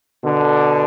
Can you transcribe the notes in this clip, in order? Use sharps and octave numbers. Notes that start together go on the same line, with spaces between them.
B2 D3